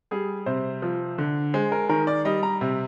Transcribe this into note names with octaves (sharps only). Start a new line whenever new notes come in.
G3 G#4
C3 C5
F3
D3
G#3 C5
A#4
D#3 A#4
D5
G3 D#5
A#5
C3